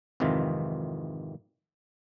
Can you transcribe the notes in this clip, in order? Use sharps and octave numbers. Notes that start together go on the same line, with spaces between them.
G#1 F2 C3 D#3 E3 F4